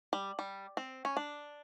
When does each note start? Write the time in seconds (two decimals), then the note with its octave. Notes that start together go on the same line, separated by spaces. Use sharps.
0.13 G3
0.39 G3
0.77 C4
1.05 C#4
1.17 D4